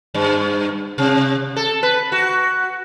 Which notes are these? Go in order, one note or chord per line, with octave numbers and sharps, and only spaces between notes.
G2
C3
A4
B4
F#4